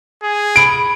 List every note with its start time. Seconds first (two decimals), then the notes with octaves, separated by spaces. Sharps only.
0.23 G#4
0.56 B5 D7